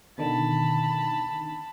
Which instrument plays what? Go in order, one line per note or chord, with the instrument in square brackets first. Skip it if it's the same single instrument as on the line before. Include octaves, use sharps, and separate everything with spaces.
[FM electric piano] B2 D3 D#3 [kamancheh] A5 B5